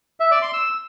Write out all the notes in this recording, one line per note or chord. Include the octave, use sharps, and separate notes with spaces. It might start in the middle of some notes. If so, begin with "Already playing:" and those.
E5
D5
C6
E6